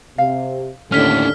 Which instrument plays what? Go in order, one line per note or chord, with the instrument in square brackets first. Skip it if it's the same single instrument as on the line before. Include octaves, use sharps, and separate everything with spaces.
[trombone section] C3 [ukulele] F5
[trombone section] D#2 A2 D3 [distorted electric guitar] C#4 D4 [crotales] F6 B6